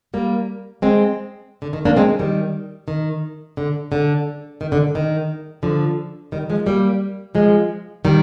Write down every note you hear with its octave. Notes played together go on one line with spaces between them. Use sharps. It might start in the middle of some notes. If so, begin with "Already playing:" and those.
G3 A#3
G#3 C4
D3
D#3
A#3 D4
G#3 C4
D#3 G3
D#3
D3
D3
D#3
D3
D#3
D3 F3
D#3 G3
F3 G#3
G3 A#3
F3 G#3
D#3 G3